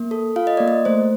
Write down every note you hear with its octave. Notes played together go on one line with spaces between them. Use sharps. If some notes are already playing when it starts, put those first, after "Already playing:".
Already playing: A#3
A4
F4 F5
D#5
A#3 D5
D#5
A3 C5